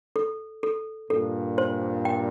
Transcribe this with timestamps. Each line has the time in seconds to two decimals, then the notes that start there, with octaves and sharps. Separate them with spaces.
0.16 A4
0.63 A4
1.10 G2 A#2 A4
1.58 C5
2.05 G5